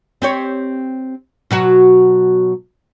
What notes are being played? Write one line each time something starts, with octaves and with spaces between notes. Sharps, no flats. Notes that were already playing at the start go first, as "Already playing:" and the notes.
C4 G4 C#5
B2 F#3 F#4